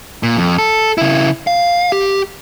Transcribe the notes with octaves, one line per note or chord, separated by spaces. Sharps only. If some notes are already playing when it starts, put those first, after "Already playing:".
A#2
F2
A4
C#3 E4
F5
G4